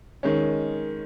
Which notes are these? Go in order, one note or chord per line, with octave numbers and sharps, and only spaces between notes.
D#3 G#3 C#4